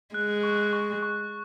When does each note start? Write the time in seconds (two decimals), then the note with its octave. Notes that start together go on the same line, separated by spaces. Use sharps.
0.14 G#3 F#6
0.43 C#6
0.73 C#6
1.03 C#6